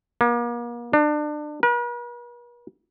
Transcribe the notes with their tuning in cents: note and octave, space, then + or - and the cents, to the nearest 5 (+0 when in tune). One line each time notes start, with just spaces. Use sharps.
A#3 +40
D4 +30
B4 -45